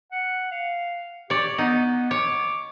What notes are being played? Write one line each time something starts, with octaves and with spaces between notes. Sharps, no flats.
F#5
F5
G4 C#5 D5
B3 D#4
C#5 D6